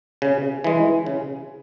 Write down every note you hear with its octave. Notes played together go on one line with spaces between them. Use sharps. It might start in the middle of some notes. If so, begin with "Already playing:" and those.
C#3
E3 G#3
C#3